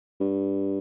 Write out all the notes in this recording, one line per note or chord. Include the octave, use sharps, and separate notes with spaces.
G2